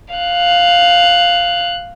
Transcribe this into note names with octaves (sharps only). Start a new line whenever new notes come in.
F5 F#6